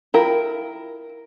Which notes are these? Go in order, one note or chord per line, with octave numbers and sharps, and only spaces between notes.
E4 F4 A#4 G5